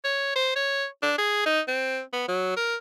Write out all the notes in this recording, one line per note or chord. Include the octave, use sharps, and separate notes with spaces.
C#5
C5
C#5
D4
G#4
D#4
C4
B3
F#3
A#4